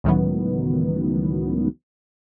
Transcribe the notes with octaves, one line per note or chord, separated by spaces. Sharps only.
C#2 A2 D#3 E3 F#3 B3